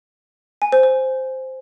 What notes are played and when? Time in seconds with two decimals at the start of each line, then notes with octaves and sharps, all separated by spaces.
0.62 G#5
0.72 C5
0.83 C5